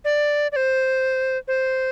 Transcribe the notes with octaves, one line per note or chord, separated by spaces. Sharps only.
D5
D5
C5
C5